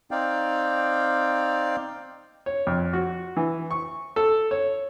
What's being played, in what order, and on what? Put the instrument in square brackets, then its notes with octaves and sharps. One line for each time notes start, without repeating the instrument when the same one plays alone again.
[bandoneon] C4 D#4 D5 F5 G5
[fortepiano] C#5
F2
F#4
E3
C#6
A4
C#5